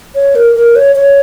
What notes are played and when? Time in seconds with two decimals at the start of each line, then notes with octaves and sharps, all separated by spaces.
0.15 C#5
0.35 A#4
0.55 A#4
0.76 C#5
0.96 C#5